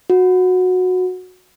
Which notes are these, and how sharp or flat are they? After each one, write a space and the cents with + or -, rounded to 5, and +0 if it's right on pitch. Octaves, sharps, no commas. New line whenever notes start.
F#4 -15